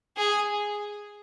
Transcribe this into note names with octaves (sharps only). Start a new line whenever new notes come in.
G#4